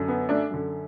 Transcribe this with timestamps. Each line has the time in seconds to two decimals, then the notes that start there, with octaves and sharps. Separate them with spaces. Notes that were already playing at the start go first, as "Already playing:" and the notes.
Already playing: F#2 D3
0.08 B3
0.29 A3 D4
0.51 F#2 D3